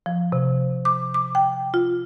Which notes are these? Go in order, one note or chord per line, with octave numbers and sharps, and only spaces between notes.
F3
C3
D6
D6
G5
F4